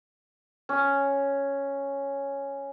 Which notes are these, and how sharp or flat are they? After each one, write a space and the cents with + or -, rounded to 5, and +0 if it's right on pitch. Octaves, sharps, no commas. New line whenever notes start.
C#4 +0